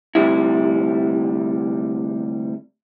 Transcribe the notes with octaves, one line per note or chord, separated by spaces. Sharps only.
D2 G#2 C3 G3 E4